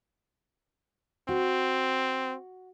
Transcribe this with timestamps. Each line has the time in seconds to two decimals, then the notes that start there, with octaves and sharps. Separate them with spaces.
1.29 C4 F#4